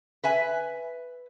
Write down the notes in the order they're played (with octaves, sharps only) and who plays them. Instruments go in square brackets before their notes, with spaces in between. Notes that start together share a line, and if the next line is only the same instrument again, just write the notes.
[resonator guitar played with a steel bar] B4 E5 G#5